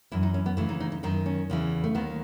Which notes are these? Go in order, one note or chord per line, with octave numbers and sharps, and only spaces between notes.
F#2 E3 E4
D#4
C#4
B3
D#2 C#3 E3 A3
D#4
D#4
D#4
F#2 D#3 D#4
C#4
E2 C#3 E3
A3
D#2 D#3 B3